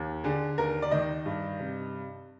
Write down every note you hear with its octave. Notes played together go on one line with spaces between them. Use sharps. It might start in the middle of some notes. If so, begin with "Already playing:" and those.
Already playing: D#2
D3 G#4
D#2 A#4
D5
D#3 D#5
G2
C3